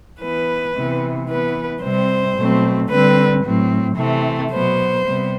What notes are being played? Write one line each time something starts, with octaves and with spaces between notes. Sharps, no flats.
E3 B3 B4
C3 E3 B3
E3 B3 B4
C3 G3 C4 C5
B2 F#3 A3 C4
D3 G3 C4 B4
A2 F#3 C4
C3 E3 A3 C4
B2 F#3 B3 C5
C3 G3 B3